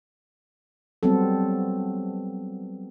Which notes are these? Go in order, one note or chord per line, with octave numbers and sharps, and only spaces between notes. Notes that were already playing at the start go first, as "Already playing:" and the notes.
F#3 G3 B3 C4 A4